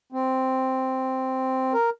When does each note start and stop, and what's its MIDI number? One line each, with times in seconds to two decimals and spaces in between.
0.12 1.73 60
1.74 1.90 70